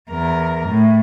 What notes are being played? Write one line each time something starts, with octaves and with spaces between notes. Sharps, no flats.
E2 A#4
A2